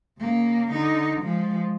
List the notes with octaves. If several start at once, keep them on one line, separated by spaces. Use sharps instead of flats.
C#3 A#3
D3 D#4
F3 G#3